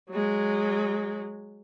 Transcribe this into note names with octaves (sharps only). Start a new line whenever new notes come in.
F#3 G#3